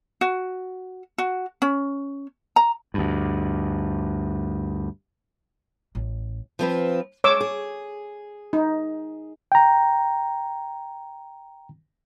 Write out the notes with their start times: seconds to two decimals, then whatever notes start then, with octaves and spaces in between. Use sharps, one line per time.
0.21 F#4
1.18 F#4
1.62 C#4
2.56 A#5
2.94 D2 G2
5.95 A1
6.59 F3 C4 B4
7.24 G#3 C#5 D6 E6
7.41 G#4
8.53 D#4
9.52 G5 A#5